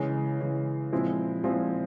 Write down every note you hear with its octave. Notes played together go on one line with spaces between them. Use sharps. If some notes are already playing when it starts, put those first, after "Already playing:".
Already playing: C#3 E3 G#3
C#3 E3 G#3
A#2 F3 G#3 C4 E4
A#2 F3 G#3 C4 E4